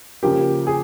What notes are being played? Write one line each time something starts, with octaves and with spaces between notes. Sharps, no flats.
C#3 F3 A#3 G4
G#4